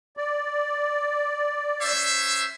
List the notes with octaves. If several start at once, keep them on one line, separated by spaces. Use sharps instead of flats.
D5
C#4 C5 E5